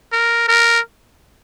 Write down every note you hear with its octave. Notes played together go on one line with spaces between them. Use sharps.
A#4
A#4